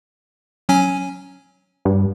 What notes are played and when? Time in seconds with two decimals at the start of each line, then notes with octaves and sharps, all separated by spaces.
0.69 F#3 C#4 G#5
1.85 G2